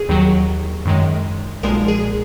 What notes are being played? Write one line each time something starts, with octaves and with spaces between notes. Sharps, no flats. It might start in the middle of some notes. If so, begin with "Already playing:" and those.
Already playing: G#4
D#2 D#3 F#3
F#2 D#3 G#3
B1 A#2 F3 G#3 A#4
G#4